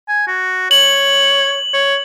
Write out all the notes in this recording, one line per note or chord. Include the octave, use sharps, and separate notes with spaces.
G#5
F#4
C#5 F#7
C#5